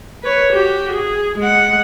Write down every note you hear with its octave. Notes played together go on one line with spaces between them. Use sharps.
B4 C#5
F#4 G4
G#4
G#3 F#5